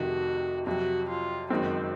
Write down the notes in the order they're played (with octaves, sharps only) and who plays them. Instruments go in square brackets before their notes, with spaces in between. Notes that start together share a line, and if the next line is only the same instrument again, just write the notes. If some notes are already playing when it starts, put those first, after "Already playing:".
Already playing: [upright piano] F1 F2 C3 D#3 [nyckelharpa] F#4
[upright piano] F2 C3 F#3 [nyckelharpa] F#4
[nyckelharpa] F4
[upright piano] F#1 F#2 D#3 G#3 C4 [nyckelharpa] F#4